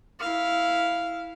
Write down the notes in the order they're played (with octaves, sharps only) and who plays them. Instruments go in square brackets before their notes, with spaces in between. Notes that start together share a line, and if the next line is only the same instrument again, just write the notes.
[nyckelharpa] E4 F5